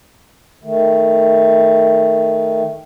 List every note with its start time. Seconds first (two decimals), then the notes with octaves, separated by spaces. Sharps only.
0.64 D#3 A3